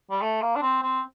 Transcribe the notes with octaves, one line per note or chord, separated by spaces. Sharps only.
G3
A3
A#3
D4
C4
C4